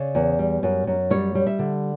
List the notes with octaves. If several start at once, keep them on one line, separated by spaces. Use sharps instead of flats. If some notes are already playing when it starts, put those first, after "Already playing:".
Already playing: C#3 D5
E2
G3
F#2
F#2
G3 C#5
G3
E5
D3